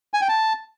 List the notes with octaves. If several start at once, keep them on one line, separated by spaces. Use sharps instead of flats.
G#5
G5
A5